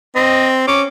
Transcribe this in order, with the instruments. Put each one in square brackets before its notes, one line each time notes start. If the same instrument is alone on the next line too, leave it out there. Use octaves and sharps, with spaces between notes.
[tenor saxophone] C4 [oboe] D#5
[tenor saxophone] C#4 [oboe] D6